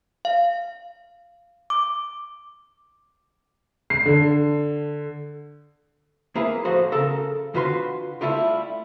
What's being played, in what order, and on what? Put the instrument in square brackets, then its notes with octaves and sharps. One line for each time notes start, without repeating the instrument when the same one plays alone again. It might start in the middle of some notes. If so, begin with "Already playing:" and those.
[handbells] F5
D6
[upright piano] C7
D3
[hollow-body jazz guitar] A#3 E4 G#4 B4
A2 F3 F#4 C5
C#3 A4 A#4
D3 F4 F#4 B4 E5 C6
G3 A3 E4 F4 G4